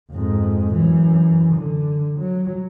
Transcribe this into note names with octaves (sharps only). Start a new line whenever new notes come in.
F2 G#2
F#2 E3
D3
F#3